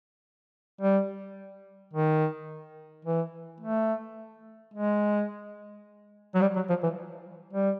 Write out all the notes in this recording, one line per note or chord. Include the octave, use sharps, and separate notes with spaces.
G3
D#3
E3
A3
G#3
F#3
G3
F#3
F3
E3
G3